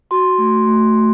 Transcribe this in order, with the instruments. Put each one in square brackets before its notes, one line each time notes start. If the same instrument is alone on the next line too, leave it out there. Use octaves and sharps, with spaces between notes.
[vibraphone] F#4 C6
A3
A3
A3